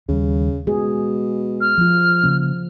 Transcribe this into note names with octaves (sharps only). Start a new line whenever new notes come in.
D#2 C#3 G3
B2 G#3 G#4
F6
F3 F4
C#3 A#3 C#4